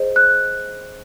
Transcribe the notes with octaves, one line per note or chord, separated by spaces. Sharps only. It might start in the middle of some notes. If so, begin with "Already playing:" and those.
Already playing: G#4 C5 D#5
F#6